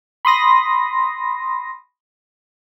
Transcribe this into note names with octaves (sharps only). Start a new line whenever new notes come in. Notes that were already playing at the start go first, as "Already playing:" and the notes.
B5 C6 D#6 A#6